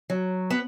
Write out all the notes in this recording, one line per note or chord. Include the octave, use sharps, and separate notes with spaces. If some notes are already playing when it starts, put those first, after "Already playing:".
F#3
B3